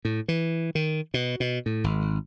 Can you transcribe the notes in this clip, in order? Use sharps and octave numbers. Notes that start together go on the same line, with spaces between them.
A2
E3
D#3
B2
B2
A2
G#1